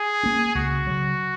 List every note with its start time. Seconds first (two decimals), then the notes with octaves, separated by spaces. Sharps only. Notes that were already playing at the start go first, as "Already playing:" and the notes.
Already playing: G#4
0.23 A#3 C#4
0.55 C#2 F#4
0.87 C#3 F#3